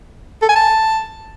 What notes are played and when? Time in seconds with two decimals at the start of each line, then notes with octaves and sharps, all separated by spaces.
0.42 A4
0.49 G#5
0.56 A5